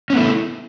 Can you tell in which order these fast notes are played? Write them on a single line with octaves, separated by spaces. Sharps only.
C#4 B3 A3 E4